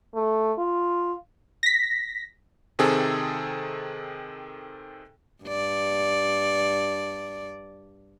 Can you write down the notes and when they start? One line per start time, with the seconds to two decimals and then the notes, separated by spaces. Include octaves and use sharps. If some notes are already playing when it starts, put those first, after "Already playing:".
0.14 A3
0.58 F4
1.63 A#6 B6
2.79 C3 D#3 C4 G#4 A4
5.44 G2 D5